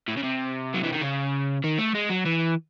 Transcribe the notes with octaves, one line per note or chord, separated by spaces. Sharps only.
A2
C#3
C3
F#3
E3
D#3
C#3
D#3
A3
G#3
F#3
E3